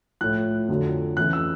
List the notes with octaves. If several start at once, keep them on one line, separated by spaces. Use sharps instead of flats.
A2 F3 F#6
F2 D3 F#3
F2 C#3 E3 F#6
E6